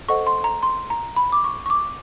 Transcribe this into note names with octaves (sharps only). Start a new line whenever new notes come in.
A4 C5 D#5 F#5 C#6
C6
A#5
C6
A#5
B5
D6
C#6
C#6
D6